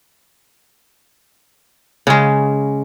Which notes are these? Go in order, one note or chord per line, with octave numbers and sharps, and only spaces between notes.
C#3 G#3